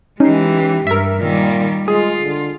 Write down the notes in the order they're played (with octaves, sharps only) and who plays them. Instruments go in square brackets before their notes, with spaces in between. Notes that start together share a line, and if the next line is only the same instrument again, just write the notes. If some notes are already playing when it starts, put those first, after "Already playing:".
[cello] E3 G#3 [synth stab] C#4 D#4 [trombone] G4
[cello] G2 [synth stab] A#4 E5
[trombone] A#2 [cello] D#3 G3
[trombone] G#3 [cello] F4 [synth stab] G#4
[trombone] D3